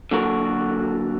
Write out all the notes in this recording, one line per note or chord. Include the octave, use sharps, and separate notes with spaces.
D3 F#3 A#3 F#4 A4 A#4